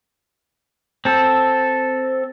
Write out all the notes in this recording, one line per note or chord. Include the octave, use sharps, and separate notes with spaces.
C4 A4